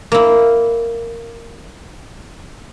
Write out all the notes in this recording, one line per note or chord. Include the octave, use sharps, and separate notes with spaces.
A#3 E4